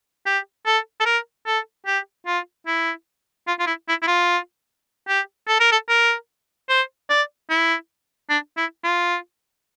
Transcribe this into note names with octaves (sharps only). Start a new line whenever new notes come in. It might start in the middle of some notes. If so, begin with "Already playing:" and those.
G4
A4
A4
A#4
A4
G4
F4
E4
F4
F4
E4
E4
E4
F4
G4
A4
A#4
A4
A#4
C5
D5
E4
D4
E4
F4